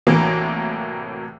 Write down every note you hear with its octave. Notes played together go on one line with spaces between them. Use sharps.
C2 A2 E3 F#3 A#3